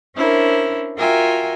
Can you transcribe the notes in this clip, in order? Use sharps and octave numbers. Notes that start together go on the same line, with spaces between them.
C#4 D4 E4 A#4 C5
F4 F#4 A#4 E5 G5 G#5